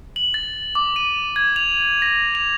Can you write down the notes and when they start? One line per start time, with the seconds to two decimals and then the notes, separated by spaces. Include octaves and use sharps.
0.16 F#7
0.34 A6
0.75 D6
0.96 D#7
1.36 G#6
1.56 F7
2.02 A#6
2.35 F7